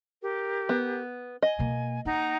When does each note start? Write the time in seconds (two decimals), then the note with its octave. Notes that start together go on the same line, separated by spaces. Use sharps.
0.22 G4 A#4
0.69 B3
1.42 D#5 G#5
1.59 B2 A#3
2.05 A#3 D#4 F#5 A#5